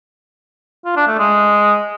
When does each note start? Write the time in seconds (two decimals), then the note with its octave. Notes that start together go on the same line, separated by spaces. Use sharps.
0.85 F4
0.96 D4
1.07 A3
1.18 G#3